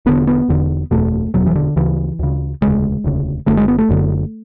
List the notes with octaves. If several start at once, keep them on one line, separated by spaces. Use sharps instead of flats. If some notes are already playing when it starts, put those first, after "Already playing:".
E1 E2 D3 B3
B3
E1 E2 D3
F#1 E2 B2 A3
F#1 E2 B2 F#3
E3
D3
D2 C#3 E3
D2 C#3
E1 D2 C#3 G#3
E1 D2 C#3
F#1 F#2 D3 A3
G#3
B3
A3
F#1 F#2 D3